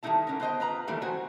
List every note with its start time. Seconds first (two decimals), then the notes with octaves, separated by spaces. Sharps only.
0.03 D#3 G3 A3 D#4 E4 A5
0.27 D3 C#4 A#4
0.40 B3 C5 D#5 G5
0.60 F4 B4 A#5
0.87 D#3 E3 G3 A3 A#3
1.02 C4 F#4 C5 G#5